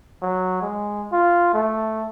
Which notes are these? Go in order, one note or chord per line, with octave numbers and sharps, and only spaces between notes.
F#3
G#3
F4
A3